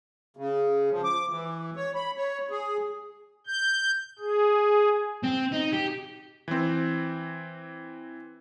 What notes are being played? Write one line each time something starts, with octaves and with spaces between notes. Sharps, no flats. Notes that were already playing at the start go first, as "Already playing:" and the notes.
C#3
F3
D6
E3
C#5
B5
C#5
G#4
G6
G#4
C4
D#4
G4
E3 C4